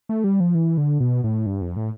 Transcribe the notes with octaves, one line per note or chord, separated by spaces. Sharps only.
A3
G3
F3
E3
D3
B2
A2
G2
F2
A2